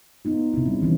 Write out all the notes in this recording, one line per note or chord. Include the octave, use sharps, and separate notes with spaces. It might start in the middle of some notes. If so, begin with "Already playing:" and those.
B3 D#4 F4
C3 E4
G3 C#4
D#3 E3 C#4